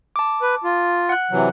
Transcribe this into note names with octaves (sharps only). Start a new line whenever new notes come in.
A5 D6
B4
F4
F#5 F#6
C3 E3 F#3